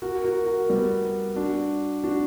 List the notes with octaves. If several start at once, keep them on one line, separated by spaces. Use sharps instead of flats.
F#4 A#4
F#4 A#4
F#4 A#4
G3 B3
D4 F#4
D4 F#4